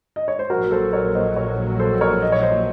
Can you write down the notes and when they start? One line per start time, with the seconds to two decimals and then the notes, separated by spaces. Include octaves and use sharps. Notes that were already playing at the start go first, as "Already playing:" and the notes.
0.16 D#5
0.28 C#5
0.39 C5
0.50 A#1 A#2 F#3 F#4 A#4
0.71 A4 C5
0.93 A#4 C#5
1.15 C5 D#5
1.37 A#4 C#5
1.79 A4 C5
2.01 A#4 C#5
2.22 D#5
2.32 C#5
2.42 C5 D#5